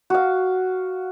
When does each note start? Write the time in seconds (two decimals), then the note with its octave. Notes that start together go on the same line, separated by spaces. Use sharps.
0.10 F#4 F5